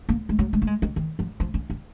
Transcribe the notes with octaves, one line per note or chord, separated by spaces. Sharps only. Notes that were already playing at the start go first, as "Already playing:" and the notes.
A#3
G#3
F#3
G#3
A#3
G#3
D#3
D#3
F3
F3
C#4
C#4